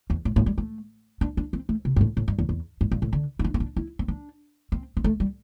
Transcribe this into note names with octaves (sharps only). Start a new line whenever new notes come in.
E2
A2
A2
G3
A3
D4
D4
C4
A3
C3
G2
A2
A2
G2
E2
E2
G2
G2
A2
D3
E4
D4
C4
D4
E4
C4
D4
C4
C4
A3
G3